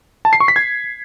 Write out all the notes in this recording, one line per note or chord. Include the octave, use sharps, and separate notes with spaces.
A5
C7
C#6
B6
G#6